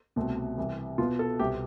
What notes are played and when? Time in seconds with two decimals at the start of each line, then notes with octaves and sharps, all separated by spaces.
0.16 C2 B2 A3 C4
0.58 C2 C3 E3
0.98 B2 B3 F4
1.19 A4
1.39 C2 B2 B3 G4